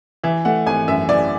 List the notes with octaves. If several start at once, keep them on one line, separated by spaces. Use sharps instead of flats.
E3 E5
A3 F#5
G#1 G#5
F#2 E5
E3 D5